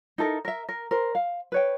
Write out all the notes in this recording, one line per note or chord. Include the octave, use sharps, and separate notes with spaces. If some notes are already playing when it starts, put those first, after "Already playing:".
D#4 E4 A4 A#4
A#4 E5
A#4
A#4 C5
F5
B4 C#5 G5